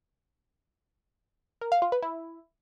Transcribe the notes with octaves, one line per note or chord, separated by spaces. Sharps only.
A#4
F5
F4
B4
E4